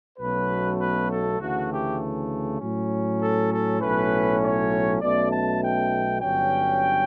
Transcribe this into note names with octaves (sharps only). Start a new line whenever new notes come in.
B1 B2 F#3 A3 C#4 B4
B4
A4
D2 C#3 E3 A3 F#4
G4
A2 F#3 C#4
A4
A4
B1 A2 F#3 C#4 B4
C#5
B1 B2 A3 C#4 D5
A5
G5
G1 G2 F#3 C#4 G5